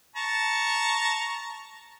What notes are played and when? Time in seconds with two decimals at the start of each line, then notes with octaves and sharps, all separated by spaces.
0.16 A5 A#5 C#6